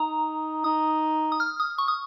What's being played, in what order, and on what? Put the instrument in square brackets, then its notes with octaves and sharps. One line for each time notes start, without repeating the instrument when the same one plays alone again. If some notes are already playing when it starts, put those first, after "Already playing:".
Already playing: [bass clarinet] D#4 [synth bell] A#5
[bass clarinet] D#4 [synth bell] D#6
[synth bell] D#6
F6
D#6
C#6
D#6